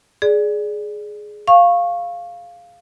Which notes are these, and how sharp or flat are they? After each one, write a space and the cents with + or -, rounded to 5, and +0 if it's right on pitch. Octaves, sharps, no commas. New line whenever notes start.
G#4 +10 D5 +0
F5 +0 C#6 -15